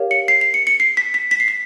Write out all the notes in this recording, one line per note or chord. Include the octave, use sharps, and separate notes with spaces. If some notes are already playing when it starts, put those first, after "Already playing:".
Already playing: G4 A#4 C#5 F5
C#7
C7
C7
C#7
C#7
C7
B6
B6
B6
C7
B6